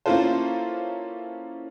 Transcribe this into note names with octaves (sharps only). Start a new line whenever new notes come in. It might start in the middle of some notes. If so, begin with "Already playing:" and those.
A#3 C#4 E4 F4 A4 C5